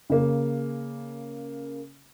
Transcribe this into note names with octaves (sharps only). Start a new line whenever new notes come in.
C#3 A#3